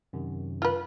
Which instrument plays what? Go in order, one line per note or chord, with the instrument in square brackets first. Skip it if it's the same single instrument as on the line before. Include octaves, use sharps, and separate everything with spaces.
[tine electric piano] F#2 C3 D#3
[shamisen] F4 B4